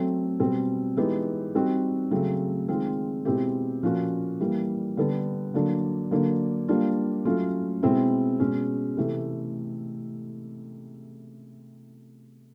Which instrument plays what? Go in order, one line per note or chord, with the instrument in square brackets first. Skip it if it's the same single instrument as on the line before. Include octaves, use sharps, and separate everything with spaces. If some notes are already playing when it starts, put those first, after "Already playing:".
Already playing: [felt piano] F#3 A3 C4
B2 G3 C4
E3 G#3 B3 D#4 G4
G3 C4 D#4 F#4
C#3 F#3 A3 C4
D#3 G#3 C4 F4
B2 G#3 C4 E4 G4
A#2 F3 A#3 C#4 F#4
E3 G3 A#3
D3 G3 B3 D4
D3 F#3 A#3 D4
D3 F#3 A#3 D4
G3 A#3 D4 F4
F#3 A3 C#4 F4
B2 G#3 C4 E4
B2 G#3 C#4
C3 E3 A3